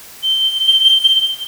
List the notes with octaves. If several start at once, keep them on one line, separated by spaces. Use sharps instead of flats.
G7